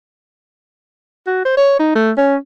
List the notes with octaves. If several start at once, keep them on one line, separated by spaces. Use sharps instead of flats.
F#4
C5
C#5
D#4
A3
C#4